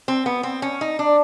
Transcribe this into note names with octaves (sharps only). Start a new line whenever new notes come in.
C4
B3
C4
C#4
D#4
D4